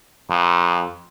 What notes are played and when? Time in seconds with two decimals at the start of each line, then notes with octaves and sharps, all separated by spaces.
0.30 F2